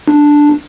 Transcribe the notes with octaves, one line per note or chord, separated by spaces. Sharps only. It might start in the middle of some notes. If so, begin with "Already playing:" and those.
D4